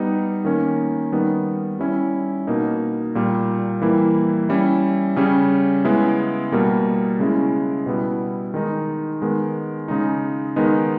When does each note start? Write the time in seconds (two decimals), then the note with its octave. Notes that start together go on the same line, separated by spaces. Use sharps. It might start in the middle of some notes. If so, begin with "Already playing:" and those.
Already playing: G3 B3 D#4
0.45 D#3 A#3 C#4
1.12 D#3 G3 B3 D#4
1.79 G3 C#4 E4
2.47 B2 A#3 D#4
3.15 A#2 G3 A#3
3.82 E3 G3 A#3 E4
4.49 G3 C#4 E4
5.16 C#3 G3 C#4
5.85 C#3 G#3 B3 E4
6.52 B2 G3 A#3
7.19 C#3 G#3 C#4 E4
7.86 B2 G3 B3 E4
8.54 D#3 G#3 D#4
9.22 D#3 G#3 B3
9.88 C#3 G#3 D#4
10.56 D#3 G#3 B3 D#4